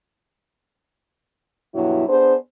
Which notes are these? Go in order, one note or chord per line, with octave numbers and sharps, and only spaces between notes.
G2 B2 F#3 E4
B3 D4 G#4 C5